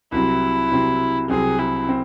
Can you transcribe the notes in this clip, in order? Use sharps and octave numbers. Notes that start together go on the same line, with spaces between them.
C2 C3 F#3 C4 E4
C2 C3 F#3 C4
C2 C3 F#3 C4 G#4
E4
C4